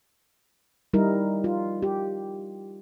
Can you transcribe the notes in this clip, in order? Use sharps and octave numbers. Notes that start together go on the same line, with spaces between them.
G3 D#4 E4 A#4
F4
G4